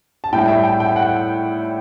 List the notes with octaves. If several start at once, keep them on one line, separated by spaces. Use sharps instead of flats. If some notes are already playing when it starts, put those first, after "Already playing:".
A5
A2 G3 G5
E5
G5
G5
F#5